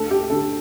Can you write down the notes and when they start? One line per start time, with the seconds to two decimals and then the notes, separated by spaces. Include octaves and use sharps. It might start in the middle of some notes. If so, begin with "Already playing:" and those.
Already playing: D2 A4
0.11 G4
0.30 D3 A4